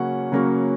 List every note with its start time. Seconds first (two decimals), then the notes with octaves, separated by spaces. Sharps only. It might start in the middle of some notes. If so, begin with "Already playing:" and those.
Already playing: C#3 F#3 A#3 C#4 F#5
0.32 C#3 F#3 A#3 C#4